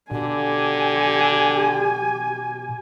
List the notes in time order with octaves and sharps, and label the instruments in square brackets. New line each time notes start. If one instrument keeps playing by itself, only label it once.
[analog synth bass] B2 [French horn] D3 [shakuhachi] G4 [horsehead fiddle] G#5